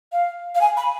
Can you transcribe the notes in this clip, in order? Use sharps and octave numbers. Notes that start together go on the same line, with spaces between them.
F5
F5
G#5
B5